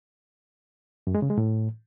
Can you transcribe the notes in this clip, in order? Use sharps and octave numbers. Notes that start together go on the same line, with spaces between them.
F#2
G#3
C#3
G#3
A2